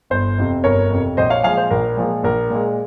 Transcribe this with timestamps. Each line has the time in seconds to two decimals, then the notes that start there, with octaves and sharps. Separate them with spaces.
0.10 G1 C5
0.38 F2 C3
0.64 G1 A#4 C#5
0.90 F2 C3
1.17 A#1 C5 D#5
1.30 C#5 F5
1.43 A#2 F3 G#3 F5 G#5
1.57 C5
1.71 A#1 A#4
1.97 A#2 F3 G#3
2.23 A#1 A#4
2.50 A#2 G#3